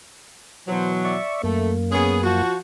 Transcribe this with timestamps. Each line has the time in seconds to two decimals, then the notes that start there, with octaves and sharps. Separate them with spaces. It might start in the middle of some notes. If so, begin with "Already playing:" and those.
0.68 B2 E3 F#3 C5
1.05 D5 E5 C#6
1.43 F#2 A3 A#3
1.92 B3 C#4 G#4
2.24 F3 F4 F#4